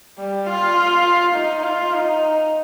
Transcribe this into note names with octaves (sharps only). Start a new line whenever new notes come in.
G3
F4
D#4
F4
D#4